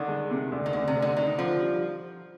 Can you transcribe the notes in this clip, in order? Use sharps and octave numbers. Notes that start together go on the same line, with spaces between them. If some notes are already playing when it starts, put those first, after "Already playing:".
Already playing: D3 D#3
G#3
C3
D2
D#3
D2 D3
C3
D2
D3
D#3 D4
D3 F3
G3